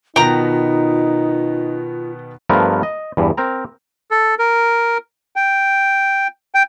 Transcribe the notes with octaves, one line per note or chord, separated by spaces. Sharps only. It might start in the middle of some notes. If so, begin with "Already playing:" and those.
B2 D#3 B3 D#4 F4 G5 A#5
G2 F3 A3 B3 A#4
D#5
E2 G2
C4 A#4 A#5
A4
A#4
G5
G5